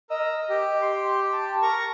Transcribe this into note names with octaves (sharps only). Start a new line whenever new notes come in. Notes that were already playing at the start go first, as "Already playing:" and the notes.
A#4 D#5 A#5 E6
G4
C6
A5
A#4 A#5 C#6